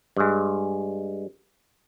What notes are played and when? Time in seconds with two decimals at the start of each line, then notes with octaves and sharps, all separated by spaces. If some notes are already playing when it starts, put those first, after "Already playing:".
0.17 G2 G#3